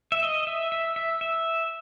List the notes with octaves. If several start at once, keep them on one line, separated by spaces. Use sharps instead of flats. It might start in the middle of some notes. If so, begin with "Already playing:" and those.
E5
D#5
E5
E5
E5
E5